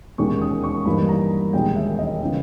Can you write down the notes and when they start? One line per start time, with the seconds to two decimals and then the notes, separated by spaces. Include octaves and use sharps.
0.18 E1 D#2 D#3 G#3 C#4 C#6
0.41 D#6
0.63 C#6
0.85 G2 E3 A#3 D#4 B5
1.09 A#5
1.53 E1 D#2 D#3 G#3 G5
1.76 E5
1.98 D#5
2.23 C#3 E3